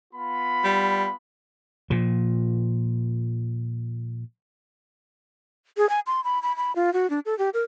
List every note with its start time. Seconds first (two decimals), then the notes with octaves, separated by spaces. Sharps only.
0.13 B3 F4 B5
0.64 G3
1.90 A#2 F3
5.77 G#4
5.89 G#5
6.07 C6
6.24 B5
6.43 B5
6.57 B5
6.76 F4
6.94 F#4
7.10 D4
7.26 A4
7.39 G4
7.54 A#4